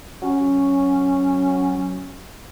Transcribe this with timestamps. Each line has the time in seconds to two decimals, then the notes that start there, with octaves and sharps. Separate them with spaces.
0.22 F#3 C#4